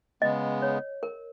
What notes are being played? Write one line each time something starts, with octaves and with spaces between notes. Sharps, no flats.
C#3 G#3 B3 D#5
C#5
A#4